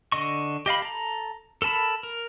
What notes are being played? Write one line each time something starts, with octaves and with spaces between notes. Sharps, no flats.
D3 D#5 C#6
G4 D#5 F5 B5
A4 A#5
A4 A#4 A5 B5
A#4